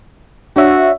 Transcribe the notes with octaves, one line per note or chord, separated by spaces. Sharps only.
D4 F#4 C#5 E5